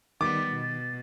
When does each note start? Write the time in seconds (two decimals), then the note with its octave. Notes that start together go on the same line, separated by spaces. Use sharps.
0.21 D#3 G3 B3 D6 A6
0.51 B2